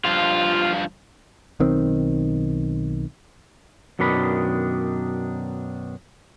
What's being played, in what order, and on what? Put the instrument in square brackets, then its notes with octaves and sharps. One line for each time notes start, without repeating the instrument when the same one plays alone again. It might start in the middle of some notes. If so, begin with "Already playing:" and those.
[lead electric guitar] G2 F3 [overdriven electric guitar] F4
[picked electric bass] B1 D#3 C4
[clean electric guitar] F#2 B2 D#3 D4 B5